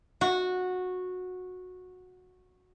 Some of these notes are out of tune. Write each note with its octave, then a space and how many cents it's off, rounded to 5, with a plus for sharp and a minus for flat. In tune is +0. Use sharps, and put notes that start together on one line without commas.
F#4 -15